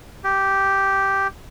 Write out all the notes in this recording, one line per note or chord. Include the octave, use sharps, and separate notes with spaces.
G4